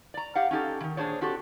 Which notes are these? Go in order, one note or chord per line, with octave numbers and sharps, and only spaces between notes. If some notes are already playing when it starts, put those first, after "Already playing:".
D5 A#5
G4 F5 F#5
C#4 D#4 G4 A4
D#3 E3
A#2 D4 G#4 C5 C#5
C4 F#4 G4 A4